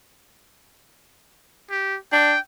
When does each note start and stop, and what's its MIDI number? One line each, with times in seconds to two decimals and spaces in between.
1.70 1.97 67
2.13 2.33 62
2.13 2.39 79